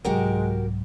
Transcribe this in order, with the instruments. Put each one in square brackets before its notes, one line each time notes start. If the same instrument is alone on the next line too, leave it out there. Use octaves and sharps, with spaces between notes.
[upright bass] C2 G#2 [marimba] F#3 [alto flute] G#3 [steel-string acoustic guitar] F#4 G4 A#4